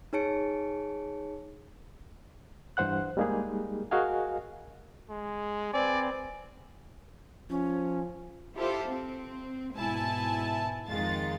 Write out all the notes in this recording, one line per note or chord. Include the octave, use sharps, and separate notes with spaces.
D#4 G#4 C#5 A5 C#7 D7
G2 E3 C5 F#5 F#6
G3 G#3 A#3 D#4 G4 G#4
F#4 G#4 A#4 D#5 F5 G#5
G#3
C4 B4 D5 G#5
F3 C#4
E4 F4 G4 A4 C5
C4
G#2 B2 E4 G#5 A5
F2 D#3 G#3 F4 A6